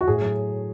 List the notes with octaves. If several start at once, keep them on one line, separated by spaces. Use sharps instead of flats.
F#4
A2 G#4
F#3